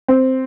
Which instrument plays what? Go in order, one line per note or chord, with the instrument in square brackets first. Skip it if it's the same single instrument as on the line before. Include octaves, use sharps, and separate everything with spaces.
[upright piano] C4